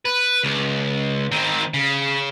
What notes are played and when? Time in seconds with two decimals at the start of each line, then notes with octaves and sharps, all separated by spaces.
0.05 B4
0.43 C#2
1.32 D#3 C4
1.74 C#3